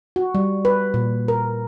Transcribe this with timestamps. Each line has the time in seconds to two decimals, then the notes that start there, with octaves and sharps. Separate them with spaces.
0.16 F#4
0.35 G3
0.65 B4
0.94 A#2
1.28 A#4